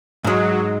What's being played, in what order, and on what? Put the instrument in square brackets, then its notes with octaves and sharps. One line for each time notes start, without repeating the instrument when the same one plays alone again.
[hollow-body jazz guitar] G#2 G#3 [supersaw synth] F#3